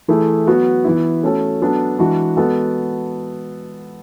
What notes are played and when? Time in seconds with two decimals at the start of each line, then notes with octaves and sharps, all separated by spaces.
0.08 E3 A3 E4 G#4
0.47 F#3 B3 F#4
0.84 E3 B3 E4
1.23 A3 C#4 F#4 A4
1.60 F#3 B3 D4 A4
1.99 E3 G#3 D4 F#4
2.37 G#3 B3 F#4 A4